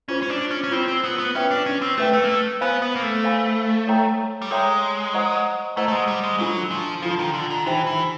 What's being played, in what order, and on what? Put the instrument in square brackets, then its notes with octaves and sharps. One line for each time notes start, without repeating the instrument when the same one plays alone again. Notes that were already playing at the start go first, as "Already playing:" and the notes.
[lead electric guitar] C#4 [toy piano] F4 G#4 C5
[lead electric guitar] C#4
D4
C#4
C#4
[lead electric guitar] C4 [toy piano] F4 G#4 C5
[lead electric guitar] C4
B3
B3
[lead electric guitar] C#4 [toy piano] G#4 B4 E5 G5
[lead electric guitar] D4
C#4
C4
[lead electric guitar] A3 [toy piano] G#4 B4 E5 G5
[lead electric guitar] A3
A#3
A3
[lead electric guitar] B3 [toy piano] C5 F5 G#5 B5
[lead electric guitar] B3
A#3
A3
[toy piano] C5 F5 G#5 B5
A4 C#5 E5 G5 A#5
[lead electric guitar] G3
[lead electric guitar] G#3 [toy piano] A4 C#5 E5 G5 A#5
[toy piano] C5 D#5 F#5 A#5 C#6
[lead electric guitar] A3 [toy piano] C5 D#5 F#5 A#5 C#6
[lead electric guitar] A3
G#3
G3
G#3
[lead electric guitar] F#3 [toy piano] D4 F4 A4
[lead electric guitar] F3
[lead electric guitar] F3 [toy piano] D4 F4 A4
[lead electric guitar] D#3
D3
D#3
[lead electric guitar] E3 [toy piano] D#4 G4 C5 E5 G5
[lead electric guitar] E3